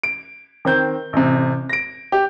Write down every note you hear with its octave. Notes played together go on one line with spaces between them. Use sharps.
D7
D#3 C4 G6
A1 C3
A#6 D7
G4